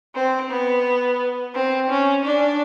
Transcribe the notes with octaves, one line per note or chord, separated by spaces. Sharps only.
C4
B3
C4
C#4
D4